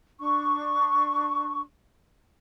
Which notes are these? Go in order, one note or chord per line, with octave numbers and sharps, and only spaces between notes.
D4 C#6